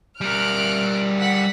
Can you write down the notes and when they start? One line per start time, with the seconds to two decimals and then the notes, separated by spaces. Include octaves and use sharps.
0.21 G3 A#4 F6 F#6 D7
1.18 F#5 B6